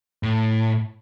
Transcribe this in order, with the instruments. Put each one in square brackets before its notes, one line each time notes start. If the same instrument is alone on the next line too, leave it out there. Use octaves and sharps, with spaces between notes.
[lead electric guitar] A2